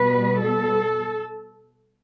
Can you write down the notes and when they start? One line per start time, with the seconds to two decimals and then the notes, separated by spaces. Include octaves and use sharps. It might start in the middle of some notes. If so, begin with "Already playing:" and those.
Already playing: B2 G3 B3 B4
0.41 A4